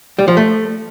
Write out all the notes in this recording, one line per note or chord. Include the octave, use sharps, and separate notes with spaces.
G3
F3
A3